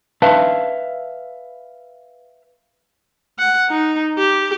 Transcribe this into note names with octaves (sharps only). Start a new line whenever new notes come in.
B4 E5 F5 A5
F#5
D#4
G4